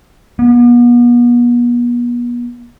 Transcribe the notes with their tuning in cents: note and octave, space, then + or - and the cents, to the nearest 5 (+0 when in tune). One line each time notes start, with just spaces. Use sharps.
B3 -40